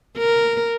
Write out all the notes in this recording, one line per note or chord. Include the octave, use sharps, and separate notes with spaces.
A#4